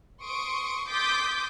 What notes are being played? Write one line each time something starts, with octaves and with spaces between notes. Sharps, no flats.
C6 C#6 D#6 C#7 D7
C6 D6 D#6 G6 A6 B6